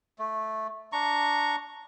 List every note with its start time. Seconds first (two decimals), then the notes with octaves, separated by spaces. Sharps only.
0.19 A3
0.93 D4 A#5 C#6